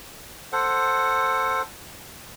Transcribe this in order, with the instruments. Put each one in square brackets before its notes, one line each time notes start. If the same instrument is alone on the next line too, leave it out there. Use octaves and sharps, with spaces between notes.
[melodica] A4 C5 F#5